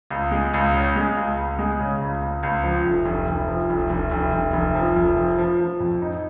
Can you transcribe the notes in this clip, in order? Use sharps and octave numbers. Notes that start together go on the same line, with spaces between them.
C#2
G#3
C#2
C#3
G#3
C#2
C#2
G#3
C#3
C#2
C#2
C#2
F3
F1
F1
F1
F3
F1
F1
F1
F1
F1
F3
F1
F3
F3
F3
F2
D#4